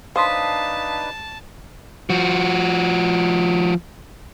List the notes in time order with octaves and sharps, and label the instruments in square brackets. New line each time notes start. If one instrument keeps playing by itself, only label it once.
[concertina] D4 D#4 B4 [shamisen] C5 [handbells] F5 D#6 B6 [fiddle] A5
[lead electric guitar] F3 F#4